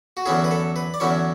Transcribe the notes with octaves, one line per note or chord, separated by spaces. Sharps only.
F#4
E2 D3 F#3 C#4 E4 G#4
B4
A4
B4
D5
E2 D3 F#3 C#4 E4 C#5